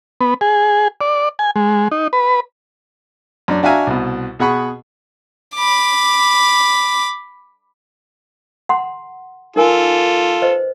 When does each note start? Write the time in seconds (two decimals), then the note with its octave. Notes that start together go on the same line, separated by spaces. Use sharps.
0.21 B3
0.41 G#4
1.01 D5
1.39 G#5
1.56 G#3
1.91 D#4
2.13 B4
3.48 F#2 D4 D5
3.63 D4 F#4 E5 F5 G#5 A#5
3.87 C2 B2
4.39 B2 G#4 F#5 B5 C#6
5.55 B5 D6
8.69 F#5 A#5 C6
9.56 D#4 F4 A4 A#4 G#5
10.42 B4 C5 D#5